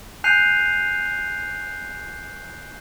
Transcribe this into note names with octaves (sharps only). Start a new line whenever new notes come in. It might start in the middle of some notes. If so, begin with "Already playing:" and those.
G#5 F#6 G6 C7 D#7 F7